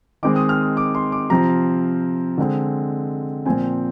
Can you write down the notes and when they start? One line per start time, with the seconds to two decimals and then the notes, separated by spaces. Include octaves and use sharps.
0.23 D#3 G#3 C4 D6
0.36 D#6
0.49 F6
0.63 D#6
0.77 D6
0.95 C6
1.12 D6
1.30 C3 F3 C4 A#5
2.38 D3 G#3 C4
3.46 A#2 F3 C4 G#5
3.64 G5